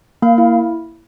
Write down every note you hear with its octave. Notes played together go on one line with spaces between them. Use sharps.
A#3 F5
E4